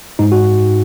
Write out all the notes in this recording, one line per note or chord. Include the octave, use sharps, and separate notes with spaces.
G#2 D#4
F#4